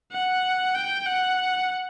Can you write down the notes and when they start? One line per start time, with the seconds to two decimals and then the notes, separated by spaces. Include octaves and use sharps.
0.12 F#5
0.75 G5
1.06 F#5